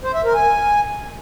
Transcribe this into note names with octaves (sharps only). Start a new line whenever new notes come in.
C5
E5
A#4
G#5